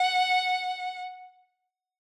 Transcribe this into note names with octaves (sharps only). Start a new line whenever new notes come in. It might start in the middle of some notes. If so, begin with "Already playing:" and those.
Already playing: F#5